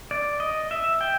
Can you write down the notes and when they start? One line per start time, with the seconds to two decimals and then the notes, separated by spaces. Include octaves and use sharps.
0.11 D5
0.40 D#5
0.71 E5
1.01 G5